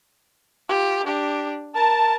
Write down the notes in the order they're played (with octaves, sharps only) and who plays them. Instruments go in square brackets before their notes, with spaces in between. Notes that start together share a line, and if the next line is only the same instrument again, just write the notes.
[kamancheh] F4 G4
D4 G4
[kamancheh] A#4 [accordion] A5